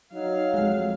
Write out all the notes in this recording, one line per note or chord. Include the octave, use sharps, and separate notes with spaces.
F#3 D#4 F5
F2 G#3